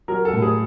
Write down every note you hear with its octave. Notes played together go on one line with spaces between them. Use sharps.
F#3 A#4
A4
A2
G#4